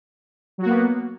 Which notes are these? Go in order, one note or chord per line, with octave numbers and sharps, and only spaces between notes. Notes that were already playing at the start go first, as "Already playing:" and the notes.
F#3 A#3 B3 F#4